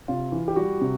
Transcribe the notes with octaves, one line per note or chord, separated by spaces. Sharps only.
C3 F4
E3
G4
G3 F#4
C3